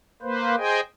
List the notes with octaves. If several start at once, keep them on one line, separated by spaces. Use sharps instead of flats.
A#3 B4 C5
G#4 C5 D#5 G5 G#5